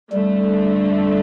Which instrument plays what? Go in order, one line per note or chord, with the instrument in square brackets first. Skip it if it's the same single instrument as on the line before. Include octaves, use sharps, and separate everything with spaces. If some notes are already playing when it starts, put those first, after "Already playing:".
[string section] F2 D3 A3 [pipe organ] G3